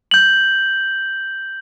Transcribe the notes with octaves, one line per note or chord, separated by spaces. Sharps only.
G6 F#7